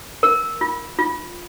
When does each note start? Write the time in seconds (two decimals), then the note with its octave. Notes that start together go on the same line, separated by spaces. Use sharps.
0.23 A#4
0.61 F4
0.99 F4